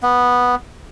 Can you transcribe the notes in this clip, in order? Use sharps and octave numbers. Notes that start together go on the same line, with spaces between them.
B3